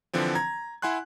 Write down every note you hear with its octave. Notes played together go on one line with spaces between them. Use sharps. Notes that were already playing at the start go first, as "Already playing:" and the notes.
D3 E3 F3 C4
A#5 G#6
E4 F#5 G#5 C6 F#6